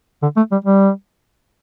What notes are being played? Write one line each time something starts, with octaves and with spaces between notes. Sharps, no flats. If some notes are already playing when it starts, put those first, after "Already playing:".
D3
A3
G3
G3